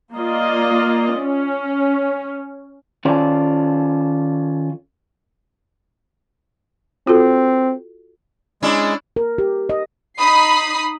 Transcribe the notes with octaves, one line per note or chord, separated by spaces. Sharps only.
A#3 F4 D5 D#5
C#4
D#3 C#4 F4 A4 C5 D5
C4 F4 F#4 A4
G#3 C#4 D4 E4
A#4
G4
D#5
D#4 B5 D#6 C7